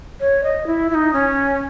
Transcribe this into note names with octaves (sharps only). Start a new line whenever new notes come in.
C#5
D#5
E4
E4
D#4
C#4